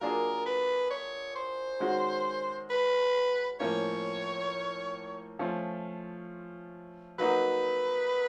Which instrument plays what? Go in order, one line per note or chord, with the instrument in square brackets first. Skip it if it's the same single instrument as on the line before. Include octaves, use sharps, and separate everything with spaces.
[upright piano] F#3 A#3 D4 F4 G#4 [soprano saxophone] A#4
[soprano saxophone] B4
C#5
C5
[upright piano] D#3 G#3 C#4 F#4
[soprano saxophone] B4
[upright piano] A2 F3 A#3 C#4 [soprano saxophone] C#5
[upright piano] F3 A3 C#4 F4
[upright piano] F#3 A#3 D#4 F#4 [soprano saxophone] B4